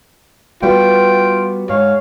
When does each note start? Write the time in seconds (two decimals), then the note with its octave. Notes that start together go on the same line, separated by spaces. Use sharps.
0.63 G3 B3 F4 F#4 G5
1.69 G#2 C#5 F5